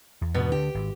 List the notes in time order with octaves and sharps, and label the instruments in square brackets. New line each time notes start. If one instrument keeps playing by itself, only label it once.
[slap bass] E2
[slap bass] E2 G#2 [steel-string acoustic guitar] B2 B3 D4
[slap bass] D2 D3 D4 [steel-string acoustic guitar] G4
[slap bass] G#1